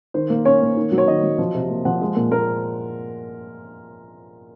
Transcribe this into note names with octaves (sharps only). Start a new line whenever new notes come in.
D#3 C5
A#3
C#4 C#5
A#3
D#3
F#3
C#5
D#3 D#5
F#3
F3
C3
A#3
F3 F#5
G#3
A#2
A#2 A#4